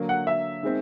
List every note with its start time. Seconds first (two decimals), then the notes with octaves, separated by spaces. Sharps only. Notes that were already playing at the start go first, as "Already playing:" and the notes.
Already playing: D3 F#3 A#3
0.09 F#5
0.27 E5
0.63 D#3 G#3 C4